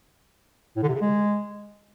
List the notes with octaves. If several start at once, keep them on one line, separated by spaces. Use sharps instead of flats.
A2
D3
C3
C#3
G#3